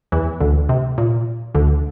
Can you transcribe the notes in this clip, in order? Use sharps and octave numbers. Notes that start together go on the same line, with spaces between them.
E2 E3
D2 D3
C3
A#2
D2 D3